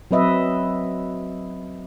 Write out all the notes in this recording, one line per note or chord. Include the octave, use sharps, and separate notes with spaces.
F#3 C4 B4 D#5 E5